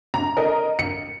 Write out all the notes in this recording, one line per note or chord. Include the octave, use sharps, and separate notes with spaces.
A#5
A#4 D#5
C#7